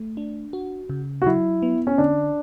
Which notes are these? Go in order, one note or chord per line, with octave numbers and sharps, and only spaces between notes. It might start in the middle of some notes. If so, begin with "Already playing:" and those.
Already playing: A3
D4
F#4
C#3
F#4
F#3 E4
B3
C#4
D3 D4